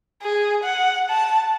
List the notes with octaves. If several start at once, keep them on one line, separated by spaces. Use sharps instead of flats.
G#4
F#5
A5